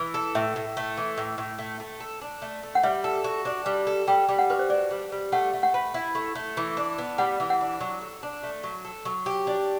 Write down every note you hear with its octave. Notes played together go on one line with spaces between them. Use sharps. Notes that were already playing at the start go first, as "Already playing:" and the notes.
Already playing: E3 B4
A4
A2 E5
A2
A3
E3
A2
A2
A3
A3
A4
D4
A3
A3
F#5
G3 E5
A4
F#4
D4
G3
A4
G3 G5
G3
F#5
F#4 B4
C5
D4 D5
G3
G3
A3 F#5
A3
F#5
B4
E4
A3
A3
E3
D4
B3
G3 F#5
E3
F#5
D4
F#3
A4
D4
A3
F#3
A4
F#3
G4
D4